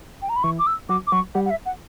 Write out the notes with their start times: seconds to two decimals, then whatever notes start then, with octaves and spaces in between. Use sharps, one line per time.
0.22 G5
0.29 A#5
0.36 B5
0.43 E3 E4 C#6
0.59 D6
0.67 E6
0.89 F#3 F#4 D6
1.07 D6
1.12 F#3 F#4 C#6
1.35 G3 G4 F#5
1.45 F#5
1.50 E5
1.65 F#5